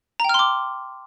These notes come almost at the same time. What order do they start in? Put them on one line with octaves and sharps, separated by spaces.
A#5 G5 F6 C6 D6